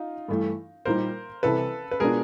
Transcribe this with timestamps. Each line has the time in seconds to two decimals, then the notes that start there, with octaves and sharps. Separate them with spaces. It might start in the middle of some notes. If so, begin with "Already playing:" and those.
Already playing: D#4 F4
0.28 G2 E3 A3
0.85 A#2 G3 A#3 D#4 A#4 C5
1.43 C2 C3 E3 A4 B4
1.91 B4
2.00 B2 G#3 B3 D4 F4 G#4 A#4